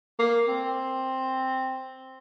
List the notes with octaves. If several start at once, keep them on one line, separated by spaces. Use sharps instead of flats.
A#3
C4